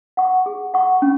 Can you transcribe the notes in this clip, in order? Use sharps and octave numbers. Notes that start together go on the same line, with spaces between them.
F#5 C#6
G#4
F#5 C#6
C#4